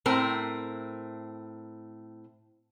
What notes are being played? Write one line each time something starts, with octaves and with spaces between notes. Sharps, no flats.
A2 C4 A#4